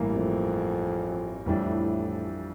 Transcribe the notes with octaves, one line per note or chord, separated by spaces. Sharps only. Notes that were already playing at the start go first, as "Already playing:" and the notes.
Already playing: A1 G2 E3 A#3
F2
F2 A2 E3 G3 D4